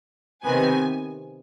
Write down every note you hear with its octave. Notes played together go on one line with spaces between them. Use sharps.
C3 D#3 B3 G#5